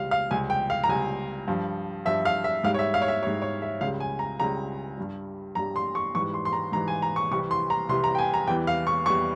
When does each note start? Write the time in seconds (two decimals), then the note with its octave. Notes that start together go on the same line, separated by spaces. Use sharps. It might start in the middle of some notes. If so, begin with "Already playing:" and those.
Already playing: C#2 C3 G3 F5
0.11 F5
0.31 C#2 C3 G3 G#5
0.50 G5
0.70 F5
0.84 A#5
0.89 C#2 C3 G3 G#5
1.47 G2 F3
2.05 G2 F3 E5
2.25 F5
2.44 E5
2.63 G#2 G3 F5
2.74 C#5
2.79 E5
2.94 F5
3.02 C#5
3.08 E5
3.23 G#2 G3 C#5
3.42 C#5
3.62 E5
3.81 C#2 C#3 G3 F5
4.00 G#5
4.19 A#5
4.40 C#2 C#3 G3 A#5
4.98 G2 G3
5.55 G2 G3 A#5
5.76 C6
5.95 C#6
6.15 G#2 E3 G3 C#6
6.34 C6
6.45 C6
6.53 A#5
6.72 G#2 E3 G3 A#5
6.88 G#5
7.02 A#5
7.16 C#6
7.31 C2 C3 E3 G3 C#6
7.51 C6
7.70 A#5
7.89 C2 C3 E3 G3 C6
8.04 A#5
8.15 G5
8.19 G#5
8.34 A#5
8.47 E2 E3 G3 G5
8.67 F5
8.87 C#6
9.06 E2 E3 G3 C#6